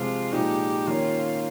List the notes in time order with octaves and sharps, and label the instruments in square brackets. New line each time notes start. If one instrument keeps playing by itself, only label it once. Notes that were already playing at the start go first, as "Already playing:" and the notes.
Already playing: [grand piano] C3 F3 G#3 C4 [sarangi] F4
[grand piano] A#2 F3 G#3 D#4 [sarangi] G4
[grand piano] D#3 A#3 C#4 [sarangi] F4